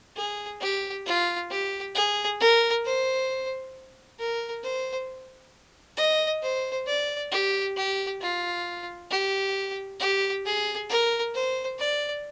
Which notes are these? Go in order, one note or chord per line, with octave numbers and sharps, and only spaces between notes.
G#4
G4
F4
G4
G#4
A#4
C5
A#4
C5
D#5
C5
D5
G4
G4
F4
G4
G4
G#4
A#4
C5
D5